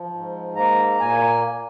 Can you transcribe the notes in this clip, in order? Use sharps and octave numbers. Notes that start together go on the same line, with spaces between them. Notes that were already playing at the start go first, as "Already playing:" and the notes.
Already playing: F3
G#2
A#3 A#5
A#2 G#5